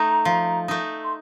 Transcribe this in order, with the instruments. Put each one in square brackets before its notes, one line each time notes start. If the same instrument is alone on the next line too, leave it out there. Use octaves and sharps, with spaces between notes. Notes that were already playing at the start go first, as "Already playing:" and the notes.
Already playing: [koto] A3 D#4 [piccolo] A#5
[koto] F3
A3 D#4
[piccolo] C6